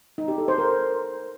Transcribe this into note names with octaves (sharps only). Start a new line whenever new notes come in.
D#4
G4
A4
C5
A#4